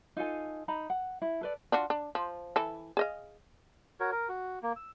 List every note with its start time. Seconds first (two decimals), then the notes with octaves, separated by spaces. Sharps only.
0.17 D#4 F4 A4 G#5
0.68 D#4 A#5 B5
0.90 F#5
1.22 E4
1.41 A4 B4 D5
1.72 D4 F4 F#4
1.90 D4
2.15 F3
2.56 E3 A4
2.97 G#4 D#5 F5
4.00 F#4 A#4 C#5
4.12 A#4
4.29 F#4
4.63 A#3
4.76 E6